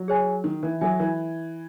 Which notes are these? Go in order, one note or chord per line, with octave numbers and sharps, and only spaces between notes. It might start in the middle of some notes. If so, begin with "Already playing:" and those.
Already playing: F#3
G#4 C#5 G#5
D#3
E3
F#3 A4 E5 G#5
E3